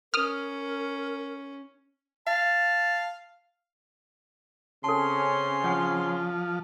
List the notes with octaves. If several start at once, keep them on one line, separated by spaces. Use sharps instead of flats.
C#4 A#4 D#6 F6
F5 A5
C#3 C4 C#4 A4 A5 C6
F3 C#5 F#5 G#5